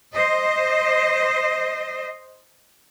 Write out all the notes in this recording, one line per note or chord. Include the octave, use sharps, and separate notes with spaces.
C5 D#5